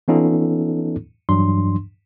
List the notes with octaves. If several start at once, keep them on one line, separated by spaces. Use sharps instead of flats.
E3 B3 C#4 D#4 F4 A4
G2 E3 F#3 D4 C6